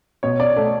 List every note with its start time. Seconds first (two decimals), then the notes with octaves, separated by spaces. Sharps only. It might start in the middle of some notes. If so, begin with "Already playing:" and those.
0.23 B2 C#5
0.40 D5
0.56 A3 D5